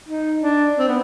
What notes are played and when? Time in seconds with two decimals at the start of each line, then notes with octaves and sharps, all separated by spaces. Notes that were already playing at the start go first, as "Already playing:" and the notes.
0.09 D#4
0.42 D4
0.78 C4
0.88 B3